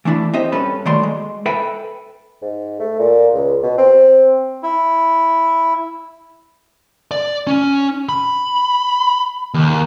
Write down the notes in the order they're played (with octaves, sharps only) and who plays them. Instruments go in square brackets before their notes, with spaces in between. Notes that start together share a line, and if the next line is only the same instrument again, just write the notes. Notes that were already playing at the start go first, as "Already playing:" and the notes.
[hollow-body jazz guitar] E3 A3 D4 E4
C4 G4 D#5 E5
G2 C#4 A4 B4
D#3 F#3 A3 D5 C6
G#3
A4 B4 E5 G5 G#5 B5
[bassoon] G#2
A3
A#2
C#2
B2
C4
[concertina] E4
[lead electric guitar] D5
C#4
B5
D#2